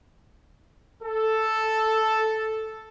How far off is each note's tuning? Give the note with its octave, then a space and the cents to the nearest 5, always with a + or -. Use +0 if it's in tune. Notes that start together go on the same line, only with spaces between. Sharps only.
A4 +0